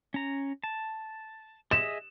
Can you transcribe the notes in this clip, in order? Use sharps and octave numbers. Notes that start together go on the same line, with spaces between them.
C#4 A#5
A5
G#4 D#5 E5 E7